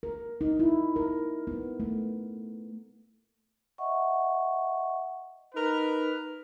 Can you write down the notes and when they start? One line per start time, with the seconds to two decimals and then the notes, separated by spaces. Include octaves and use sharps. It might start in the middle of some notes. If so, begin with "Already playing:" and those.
0.03 A#4
0.41 D#4
0.60 E4
0.96 A#4
1.47 B3
1.80 A3
3.78 D#5 E5 F#5 C#6
5.54 D#4 A#4 B4